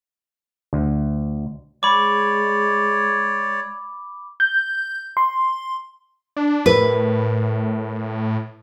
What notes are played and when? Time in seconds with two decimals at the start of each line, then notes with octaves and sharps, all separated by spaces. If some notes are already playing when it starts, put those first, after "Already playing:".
0.73 D2
1.83 G#3 C#5 D5 B5 D6
4.40 G6
5.17 C6
6.37 D4
6.66 A2 A#4 B4